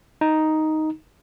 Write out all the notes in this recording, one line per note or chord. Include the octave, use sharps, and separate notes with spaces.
D#4